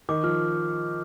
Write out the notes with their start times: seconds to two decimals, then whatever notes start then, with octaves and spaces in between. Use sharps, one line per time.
0.09 D#3 D6
0.23 F3 F6